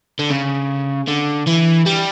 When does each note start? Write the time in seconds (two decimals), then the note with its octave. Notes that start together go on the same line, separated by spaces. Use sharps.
0.19 D3
0.31 C#3
1.08 D3
1.47 E3
1.86 G3